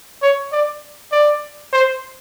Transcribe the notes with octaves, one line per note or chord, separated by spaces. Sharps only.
C#5
D5
D5
C5